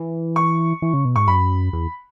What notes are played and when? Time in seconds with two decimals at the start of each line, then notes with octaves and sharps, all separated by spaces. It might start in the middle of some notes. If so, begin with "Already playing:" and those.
Already playing: E3
0.36 C#6
0.82 E3
0.94 C#3
1.05 B2
1.16 G#2 C#6
1.28 F#2 B5
1.73 E2